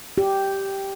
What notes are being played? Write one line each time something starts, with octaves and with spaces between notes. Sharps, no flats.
G4